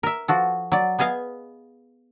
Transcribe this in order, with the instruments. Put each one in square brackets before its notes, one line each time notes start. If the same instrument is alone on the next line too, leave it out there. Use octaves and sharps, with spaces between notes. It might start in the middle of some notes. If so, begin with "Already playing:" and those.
[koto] A#4 E5
F3 F#4 A4
F#3 D5
B3 G#4 D#5 F5 G#5